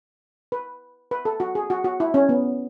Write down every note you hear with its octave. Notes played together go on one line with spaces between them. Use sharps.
B4
B4
A4
F#4
G#4
F#4
F#4
E4
C#4
B3